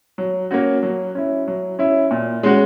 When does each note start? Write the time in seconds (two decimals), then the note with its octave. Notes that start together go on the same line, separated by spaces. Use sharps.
0.18 F#3
0.51 A#3 C#4 F#4
0.83 F#3
1.15 C#4 E4
1.48 F#3
1.79 C#4 E4
2.11 A#2
2.43 G#3 C#4 F#4